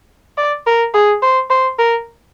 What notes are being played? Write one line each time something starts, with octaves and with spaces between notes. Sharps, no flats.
D5
A#4
G#4
C5
C5
A#4